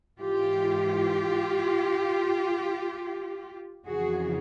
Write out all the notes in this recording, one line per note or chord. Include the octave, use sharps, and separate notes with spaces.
G#2 E3 F4 G4
F2 C#3 E3 F#4 G#4